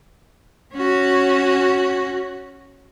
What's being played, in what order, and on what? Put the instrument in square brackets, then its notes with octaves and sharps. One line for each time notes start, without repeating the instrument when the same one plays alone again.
[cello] C#4 F#4